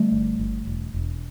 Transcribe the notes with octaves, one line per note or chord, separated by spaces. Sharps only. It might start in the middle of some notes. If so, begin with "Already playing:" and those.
Already playing: D3 G3 A3
G1
G1
E1
E1